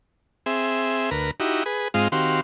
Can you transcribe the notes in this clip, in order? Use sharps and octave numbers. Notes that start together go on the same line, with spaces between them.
C4 G#4 E5
D2 A#4 B4
D#4 E4 F#4 G4
G#4 B4
G#2 G#3 C4 F4 D#5 F5
D#3 C4 F#4 G4 F5 C6